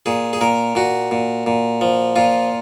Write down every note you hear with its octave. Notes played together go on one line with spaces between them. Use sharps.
A#2 G#4
G#4
A#2 A#4
A#2 F#4
A#2
A#2
F3
A#2 F4